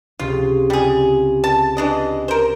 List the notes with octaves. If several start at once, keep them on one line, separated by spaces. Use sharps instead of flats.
C#2 C3 F4 G4
G3 G4 G#4
A5
E3 D4 D#5
A#4 C5